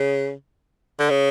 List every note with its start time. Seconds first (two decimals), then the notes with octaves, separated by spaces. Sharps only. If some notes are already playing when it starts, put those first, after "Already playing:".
Already playing: C#3
0.99 D3
1.10 C#3